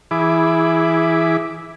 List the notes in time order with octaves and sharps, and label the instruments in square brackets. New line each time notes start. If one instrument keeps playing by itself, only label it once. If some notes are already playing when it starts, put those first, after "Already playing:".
[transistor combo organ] E3 E4 G#4 B5 D6